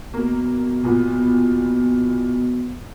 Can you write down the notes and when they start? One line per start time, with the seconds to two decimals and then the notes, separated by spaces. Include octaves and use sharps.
0.14 B2 A#3
0.84 A#2 B3